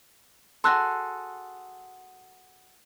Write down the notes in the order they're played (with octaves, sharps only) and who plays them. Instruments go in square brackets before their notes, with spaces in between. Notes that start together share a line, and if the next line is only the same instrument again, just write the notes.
[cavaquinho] F#4 G#4 A4 [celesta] C6 E6 F#6